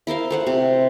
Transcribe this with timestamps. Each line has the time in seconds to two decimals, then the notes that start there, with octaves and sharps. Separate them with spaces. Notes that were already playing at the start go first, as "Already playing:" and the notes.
0.07 E4 A#4 C5 F5
0.31 A3 C5 F#5
0.47 C3